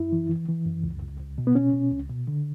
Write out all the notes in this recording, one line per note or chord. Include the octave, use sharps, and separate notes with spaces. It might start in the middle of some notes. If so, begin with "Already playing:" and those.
Already playing: F#2 E4
E3
E3
E3
F#2
C#2
C#2
C#2
B2
B3
B2 C#4
B2
C#2
B2
D3